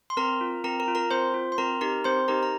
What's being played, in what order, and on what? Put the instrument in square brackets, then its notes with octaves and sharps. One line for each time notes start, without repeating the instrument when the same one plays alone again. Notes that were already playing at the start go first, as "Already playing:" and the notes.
[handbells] C6
C4 A#4 A#5
F4
C4 A#4 A#5
A#4 A#5
F4
A#4 A#5
C4 C5 C6
F4
C6
C4 A#4 A#5
D#4 G4 A#4 A#5
C4 C5 C6
D#4 G4 A#4 A#5
A#5